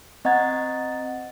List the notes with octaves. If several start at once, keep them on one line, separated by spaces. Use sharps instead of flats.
C4 D#5 F#5 A#5 G#6 A6